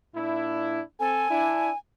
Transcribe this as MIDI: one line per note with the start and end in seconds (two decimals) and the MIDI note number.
0.15 0.80 46
0.15 0.80 62
0.15 0.80 64
1.00 1.28 60
1.00 1.28 69
1.00 1.77 80
1.29 1.69 62
1.29 1.69 64